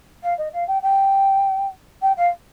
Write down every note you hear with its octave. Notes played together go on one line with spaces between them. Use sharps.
F5
D#5
F5
G5
G5
G5
F5